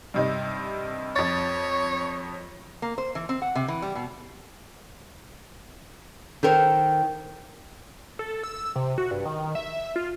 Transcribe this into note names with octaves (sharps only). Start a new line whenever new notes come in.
G2 C3 D#4
F2 C#5 A6
A#3
C5
E3
C4
F#5
C3
E3
G3
B2
D#3 A4 A#4 C5
A4
E6
E6
C3
F#4
G2
D#3
E5
F4